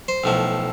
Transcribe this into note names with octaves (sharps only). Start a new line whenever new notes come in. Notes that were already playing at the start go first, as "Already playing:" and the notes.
C5
B1 A2 F3